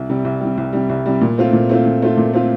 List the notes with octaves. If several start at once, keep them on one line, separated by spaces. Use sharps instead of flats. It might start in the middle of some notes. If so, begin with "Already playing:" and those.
Already playing: C2
C3 G3
C2
C3 G3
C2
C3 G3
C2
C3 G3
A#2
A3 C4 F4
A#2
A3 C4 F4
A#2
A3 C4 F4
A#2
A3 C4 F4